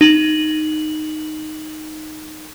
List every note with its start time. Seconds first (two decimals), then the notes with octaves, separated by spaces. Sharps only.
0.01 D#4 F#7